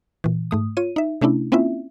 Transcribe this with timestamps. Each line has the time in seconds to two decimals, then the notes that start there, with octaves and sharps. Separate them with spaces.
0.24 A#2 E3
0.51 G#2 A3 D#6
0.77 F4 C#5 D#7
0.96 D#4 E5
1.21 C3 A3 C#4 D4 E4
1.52 A#3 C4 C#4 E4 F4 E5